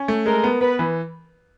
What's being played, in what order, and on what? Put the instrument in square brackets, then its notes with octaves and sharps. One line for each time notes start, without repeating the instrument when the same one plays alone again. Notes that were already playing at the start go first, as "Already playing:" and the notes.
Already playing: [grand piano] C#4
A3
[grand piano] G#3 [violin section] A#4
[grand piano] B3
[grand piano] B3 [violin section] B4
[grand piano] E3